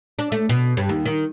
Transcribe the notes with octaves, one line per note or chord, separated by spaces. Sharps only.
D4
A3
B2
G2
D#2
D#3